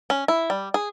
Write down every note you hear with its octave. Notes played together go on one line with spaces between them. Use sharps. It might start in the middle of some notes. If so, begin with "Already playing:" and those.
C#4
E4
G3
G#4